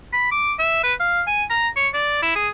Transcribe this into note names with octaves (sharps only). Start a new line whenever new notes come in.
B5
D6
E5
B4
F5
G#5
A#5
C#5
D5
E4
G#4